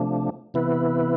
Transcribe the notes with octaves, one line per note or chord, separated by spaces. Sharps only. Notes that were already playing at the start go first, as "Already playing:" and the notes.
Already playing: C3 F3 A3 D4
C3 E3 B3 E4 B4